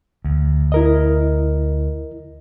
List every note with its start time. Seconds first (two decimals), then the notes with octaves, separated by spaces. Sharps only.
0.24 D2
0.72 E4 A#4 D#5